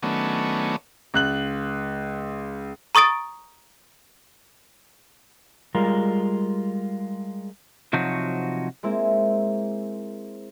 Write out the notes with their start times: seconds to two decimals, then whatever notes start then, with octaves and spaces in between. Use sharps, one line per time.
0.02 D#3 F#3 A3 B3 C#4 D4
1.14 C#2 F#6 F#7
2.95 A#5 C#6 D#6 A6 D7
5.75 G3 G#3 F4 A#4
7.93 C3 F3 F#3 D#4 F#4
8.83 G#3 A#3 C4 E4